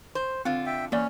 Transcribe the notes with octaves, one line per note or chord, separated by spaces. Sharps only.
C5
D3 C4 F4
E5 G5
E2 A#3 C#4 D5